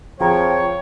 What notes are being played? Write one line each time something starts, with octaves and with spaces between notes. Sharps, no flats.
F2 F3 G#4 C#5 G5 A#5